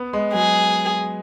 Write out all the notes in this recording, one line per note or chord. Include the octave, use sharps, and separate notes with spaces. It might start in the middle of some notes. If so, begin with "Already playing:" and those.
Already playing: B3
G#3
F#3 G#4